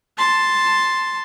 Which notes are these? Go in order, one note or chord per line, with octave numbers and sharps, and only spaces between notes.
A5 C6